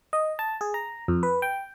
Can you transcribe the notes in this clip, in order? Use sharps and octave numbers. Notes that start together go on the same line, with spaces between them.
D#5
A5
G#4
A#5
F2
B4
G5